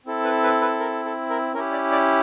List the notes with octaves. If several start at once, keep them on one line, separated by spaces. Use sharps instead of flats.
C4 E4 A4
B4
B4
B4
A#4
A4
A#4
C#4 E4 G4 A#4
D5
D5